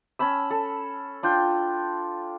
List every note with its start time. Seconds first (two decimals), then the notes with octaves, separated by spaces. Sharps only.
0.19 C#4 A5 B5 E6
0.50 A4
1.23 D4 F4 G5